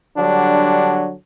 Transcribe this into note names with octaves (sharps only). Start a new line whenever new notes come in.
D3 F#3 G3 D4